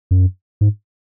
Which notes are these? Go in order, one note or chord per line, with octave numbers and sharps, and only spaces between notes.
F#2
G#2